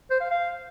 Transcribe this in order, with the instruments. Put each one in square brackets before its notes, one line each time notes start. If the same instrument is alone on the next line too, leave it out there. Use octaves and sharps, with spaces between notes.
[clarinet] C5
F5
F5